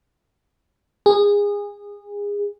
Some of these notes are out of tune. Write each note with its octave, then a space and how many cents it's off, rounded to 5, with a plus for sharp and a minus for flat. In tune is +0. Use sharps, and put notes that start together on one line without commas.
G#4 -25